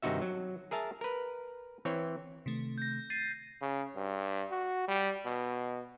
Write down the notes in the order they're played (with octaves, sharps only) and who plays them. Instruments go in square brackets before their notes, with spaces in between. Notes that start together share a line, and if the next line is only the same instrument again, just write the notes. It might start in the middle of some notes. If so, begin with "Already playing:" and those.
[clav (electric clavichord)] G2 C3 D#3 D#4 F#4 E5
F#3
G#4 A#4 E5 A5 A#5
A#4 B4
E3 C4 C#5
[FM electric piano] C3 D#3 A3
[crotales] G6 A#6
A6 C7 D#7
[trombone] C#3
G2
F#4
G3
B2